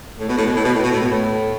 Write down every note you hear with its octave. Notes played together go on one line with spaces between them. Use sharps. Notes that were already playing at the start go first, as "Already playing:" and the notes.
A2
B2
A2
B2
A2
B2
A2
B2
A2
B2
A2